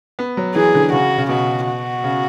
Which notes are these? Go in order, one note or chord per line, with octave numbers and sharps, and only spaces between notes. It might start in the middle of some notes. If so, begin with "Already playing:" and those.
B3
F#3
E3 G#4
D3
C#3 F#4
C#3
B2 F#4
F#4
C#3